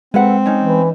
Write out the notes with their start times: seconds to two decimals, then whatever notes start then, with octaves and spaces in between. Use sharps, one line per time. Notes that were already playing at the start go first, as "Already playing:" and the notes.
0.14 G#3 C4 A4 B4 F#5
0.46 C#4 D#4
0.61 E3